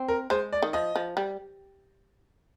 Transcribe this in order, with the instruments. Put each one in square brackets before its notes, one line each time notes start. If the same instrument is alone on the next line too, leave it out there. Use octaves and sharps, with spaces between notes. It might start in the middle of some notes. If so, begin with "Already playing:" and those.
Already playing: [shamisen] C4
[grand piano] A#4
[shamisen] G#3 [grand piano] C5
[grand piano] D5
[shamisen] D#3
[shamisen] F3 [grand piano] D#5
[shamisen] F3
G3